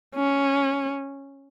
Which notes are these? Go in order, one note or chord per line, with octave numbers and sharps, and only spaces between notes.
C#4